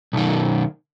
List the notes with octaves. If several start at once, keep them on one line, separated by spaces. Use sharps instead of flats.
B1 D#3